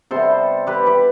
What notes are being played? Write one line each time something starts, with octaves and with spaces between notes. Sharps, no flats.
C3 G3 B3 A4 C5
G4 B4
G4 B4